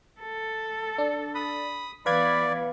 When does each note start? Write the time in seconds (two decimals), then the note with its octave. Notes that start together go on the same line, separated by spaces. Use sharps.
0.20 A4
0.98 D4
1.35 B5 D#6
2.06 E3 B3 B4 D5 F5 B5 G#6